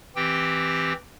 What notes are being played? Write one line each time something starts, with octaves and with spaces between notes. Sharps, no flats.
E3 C4 G4 G5